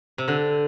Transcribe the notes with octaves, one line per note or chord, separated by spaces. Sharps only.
C3
D3